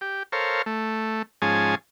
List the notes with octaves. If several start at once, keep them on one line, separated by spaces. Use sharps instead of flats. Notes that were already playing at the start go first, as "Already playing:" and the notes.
G4
A4 A#4 C5 C#5 F5
A3
G#2 F3 C#4 G#4 G#5 A5